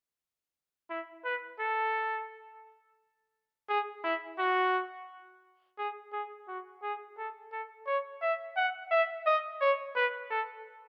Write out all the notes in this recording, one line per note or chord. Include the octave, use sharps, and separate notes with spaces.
E4
B4
A4
G#4
E4
F#4
G#4
G#4
F#4
G#4
A4
A4
C#5
E5
F#5
E5
D#5
C#5
B4
A4